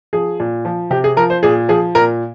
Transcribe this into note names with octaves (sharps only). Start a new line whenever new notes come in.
F3 G#4
A#2
F3
C3 G4
G#4
F3 A#4
C5
A#2 G#4
F3 G#4
A#2 A#4